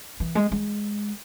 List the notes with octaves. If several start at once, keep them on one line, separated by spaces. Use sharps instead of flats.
E3
G#3
G#3